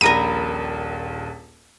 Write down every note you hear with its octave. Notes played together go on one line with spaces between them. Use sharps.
D#1 A#1 A#4 A#5 B5 D#7